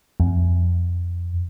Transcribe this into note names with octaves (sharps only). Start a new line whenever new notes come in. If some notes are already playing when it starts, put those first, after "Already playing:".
F2